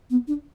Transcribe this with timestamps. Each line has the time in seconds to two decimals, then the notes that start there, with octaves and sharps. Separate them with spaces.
0.10 B3
0.28 D4